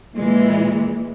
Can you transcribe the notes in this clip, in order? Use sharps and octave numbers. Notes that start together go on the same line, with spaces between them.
A#2 E3 G#3